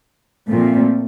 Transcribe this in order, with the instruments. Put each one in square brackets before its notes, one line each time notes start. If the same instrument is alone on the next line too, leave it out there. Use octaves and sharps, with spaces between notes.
[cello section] A#2 F3 A3 C4